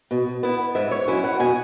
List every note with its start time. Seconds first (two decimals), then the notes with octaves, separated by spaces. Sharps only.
0.11 B2
0.43 B3 E4
0.75 G#2 E5
0.91 C#5
1.08 F#3 C#4 E4
1.24 F#5
1.39 B2 G#5